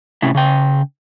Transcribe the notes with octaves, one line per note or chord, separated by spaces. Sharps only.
A2 C3 C#4 E4
C#3 G5